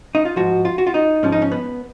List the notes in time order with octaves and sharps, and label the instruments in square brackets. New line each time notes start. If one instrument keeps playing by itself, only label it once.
[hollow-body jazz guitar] D#4
F4
G#2 F3 F#4
F4
F#4
F4
D#4
G#2 F3 C#4
D#4
C#4
B3